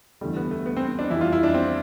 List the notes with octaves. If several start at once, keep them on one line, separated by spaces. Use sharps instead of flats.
E2 D3 G3 A3
B3
A3
B3
C4
C4
D4
F2 E3 G3 E4
F4
E4
D4
C4